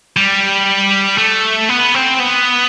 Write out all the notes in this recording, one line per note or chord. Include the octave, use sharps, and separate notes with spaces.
G3
A3
B3
C4
B3